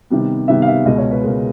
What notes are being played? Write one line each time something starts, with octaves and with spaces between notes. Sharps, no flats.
C3 D#3 G3 B3
C3 D#3 G3 B3 E5
F5
E5
C#2 B2 G#3 D#5
C#5
B4
C#2 B2 G#3 A#4